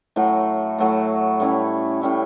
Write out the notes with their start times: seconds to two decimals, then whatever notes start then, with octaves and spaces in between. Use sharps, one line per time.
0.16 A2 F#3 A3
0.78 A2 F#3 A3
1.40 A2 G3 C#4 E4
2.01 A2 G3 C#4 E4